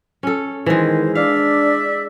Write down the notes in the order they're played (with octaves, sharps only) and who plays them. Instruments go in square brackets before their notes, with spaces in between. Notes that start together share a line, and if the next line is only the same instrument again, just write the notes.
[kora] C#4 A4
[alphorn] D#3 [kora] E3 G#3 [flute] C5
[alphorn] D4 [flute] D5 [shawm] E5 [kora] F5